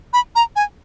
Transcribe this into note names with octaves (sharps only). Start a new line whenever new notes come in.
B5
A#5
G#5